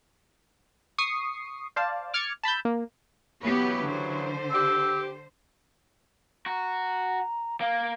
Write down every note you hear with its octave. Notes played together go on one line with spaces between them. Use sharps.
C#6 D#6 C7
C5 D5 F5 A5
D6 F6 G#6 A6 C#7
A5 B5 E6 G6
A#3
C#3 E3 F#3 B3 G4 B4
D3 C5
G4 E6
F#4 A#5
A#3 F5